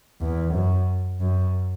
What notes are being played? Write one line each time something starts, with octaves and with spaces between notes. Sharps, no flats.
E2
F#2
F#2